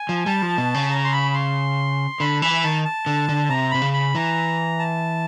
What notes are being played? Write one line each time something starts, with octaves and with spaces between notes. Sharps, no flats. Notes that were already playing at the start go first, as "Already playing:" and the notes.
Already playing: G#5
F3
G3 A5
F3
B2
C#3
A#5
C6
B5
C6
D3 B5
E3 B5
D#3 A5
A5
D3
D3
C3 A#5
C3 B5
C#3
B5
E3 A#5
A5